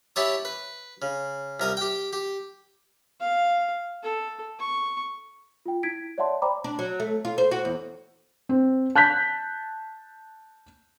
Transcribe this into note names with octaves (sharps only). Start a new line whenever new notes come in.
E4 G4 C#5 A5 D#6
B4
C#3
C2 A#4 D#6
G4 G5
G4
F5
A4
C#6
F4 G5
E4 G#6 B6 D7
C#5 D5 E5 F#5 A5 C6
C5 D5 G5 A#5 B5 D6
D4
F#3
A3
F4
C5
F#4
E2
C4
A5 F#6 G6 B6